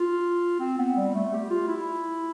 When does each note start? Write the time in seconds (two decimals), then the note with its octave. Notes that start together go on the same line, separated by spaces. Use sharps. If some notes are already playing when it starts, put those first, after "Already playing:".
Already playing: F4
0.60 C4
0.78 B3
0.96 G3
1.14 A3
1.33 G4
1.50 F4
1.68 E4